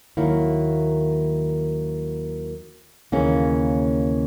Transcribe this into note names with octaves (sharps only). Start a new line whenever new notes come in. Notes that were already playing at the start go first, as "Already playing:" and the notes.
D#2 D#3 F#3 A#3 E4
D#2 C#3 E3 A#3 C#4